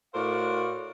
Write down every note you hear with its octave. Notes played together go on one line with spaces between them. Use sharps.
A2 F#4 A#4 C5 D5 F5